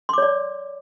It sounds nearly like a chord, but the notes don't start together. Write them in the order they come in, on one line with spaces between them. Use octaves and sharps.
C6 D6 C#5 D5